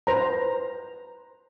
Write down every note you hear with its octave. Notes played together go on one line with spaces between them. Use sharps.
B4 C5 A#5